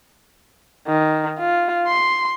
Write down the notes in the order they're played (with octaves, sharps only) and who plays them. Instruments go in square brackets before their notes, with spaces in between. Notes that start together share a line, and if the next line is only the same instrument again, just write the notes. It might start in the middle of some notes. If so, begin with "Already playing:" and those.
[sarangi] D#3
F4
C6